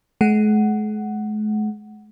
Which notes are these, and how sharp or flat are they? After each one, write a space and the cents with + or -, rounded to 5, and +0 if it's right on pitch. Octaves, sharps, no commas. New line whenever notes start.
G#3 +45 F#5 +5